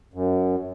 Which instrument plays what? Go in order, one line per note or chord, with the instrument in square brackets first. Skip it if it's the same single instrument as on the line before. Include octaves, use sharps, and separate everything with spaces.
[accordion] F#2